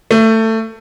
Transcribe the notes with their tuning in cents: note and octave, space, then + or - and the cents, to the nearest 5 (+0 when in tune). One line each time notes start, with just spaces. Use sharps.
A3 +20